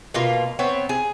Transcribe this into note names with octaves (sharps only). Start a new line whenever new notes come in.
B2 A#3 F4
B3 C4 C#5
G#4